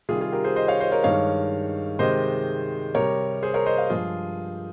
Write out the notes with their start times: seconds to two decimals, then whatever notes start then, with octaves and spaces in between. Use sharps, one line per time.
0.09 C3 D#3 G3 F4 G#4
0.21 F4 G#4
0.32 G4 A#4
0.44 G#4 C5
0.56 C5 D#5
0.68 C#5 F5
0.80 C5 D#5
0.92 A#4 C#5
1.04 G2 D#3 G#3 C#5 F5
1.99 C3 D#3 G#3 C5 D#5
2.95 C3 G3 A#4 C#5
3.43 G#4 C5
3.54 A#4 C#5
3.66 C5 D#5
3.78 C#5 F5
3.90 G2 F3 G#3 F4 G#4